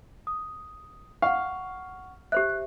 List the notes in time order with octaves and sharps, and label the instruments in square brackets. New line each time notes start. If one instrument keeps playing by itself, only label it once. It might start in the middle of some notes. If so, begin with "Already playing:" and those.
[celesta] D#6
[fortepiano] F5 [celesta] F#5 C#6
[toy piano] G4 C5 E5 [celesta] F#6